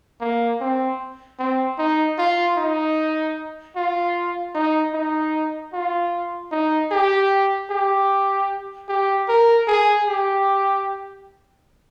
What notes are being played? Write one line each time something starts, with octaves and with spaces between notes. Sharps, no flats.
A#3
C4
C4
D#4
F4
D#4
F4
D#4
D#4
F4
D#4
G4
G4
G4
A#4
G#4
G4